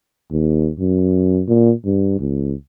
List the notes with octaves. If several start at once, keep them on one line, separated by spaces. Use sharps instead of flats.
D#2
F#2
A#2
G2
C#2